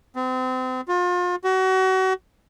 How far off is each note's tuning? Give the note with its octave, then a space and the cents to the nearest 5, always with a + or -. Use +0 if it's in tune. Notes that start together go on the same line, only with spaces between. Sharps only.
C4 -35
F4 +35
F#4 +30